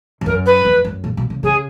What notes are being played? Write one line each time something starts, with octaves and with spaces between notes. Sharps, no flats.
F2
F#2 A#4
B4
F2
F#2
A#2
B2
C#3
C#3 G#4